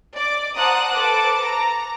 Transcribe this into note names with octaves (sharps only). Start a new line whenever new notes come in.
D5 D6
C5 F#5 A5 A#5 D#6 F#6
A4 B4 C5 A5 D6
A#5